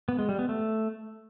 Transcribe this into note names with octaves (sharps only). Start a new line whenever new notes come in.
B3
G#3
G3
B3
A3